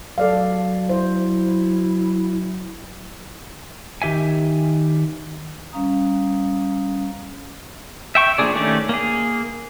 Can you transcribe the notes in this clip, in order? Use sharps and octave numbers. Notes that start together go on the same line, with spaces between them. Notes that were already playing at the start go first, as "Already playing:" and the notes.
F#3 A4 D5 F5
E4 C5
D#3 G4 E5 G#5
G3 C#4 F5 A#5 D#6
E5 G5 C#6
F3 A#3 D4 G#4 D5
D#3 A3 C#4 G4 D5
A#3 G#4